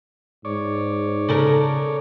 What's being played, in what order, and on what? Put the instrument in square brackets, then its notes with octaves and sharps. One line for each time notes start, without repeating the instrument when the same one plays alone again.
[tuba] G#2 [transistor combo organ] C#5 D5
[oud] C#3 A4 A#4